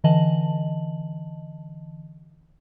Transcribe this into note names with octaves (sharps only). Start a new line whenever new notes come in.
D3 E3 D#5 A5 F#7